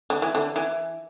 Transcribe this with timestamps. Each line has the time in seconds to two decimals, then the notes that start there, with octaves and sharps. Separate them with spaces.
0.10 D3
0.22 E3
0.35 D3
0.56 E3